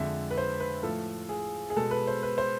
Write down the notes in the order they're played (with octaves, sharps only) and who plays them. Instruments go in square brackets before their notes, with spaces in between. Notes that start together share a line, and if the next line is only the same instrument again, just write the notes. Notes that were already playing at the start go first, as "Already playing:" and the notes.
Already playing: [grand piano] F2 D3 G#3 E5
B4
C5
B4
A2 F3 A3 A4
G#4
G#4
B2 G#3 A4
B4
C5
B4
C5